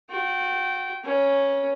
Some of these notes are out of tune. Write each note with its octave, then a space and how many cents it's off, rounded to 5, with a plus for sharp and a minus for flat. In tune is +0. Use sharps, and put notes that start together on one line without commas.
F#4 -40 G5 -20
C#4 +0 B4 -45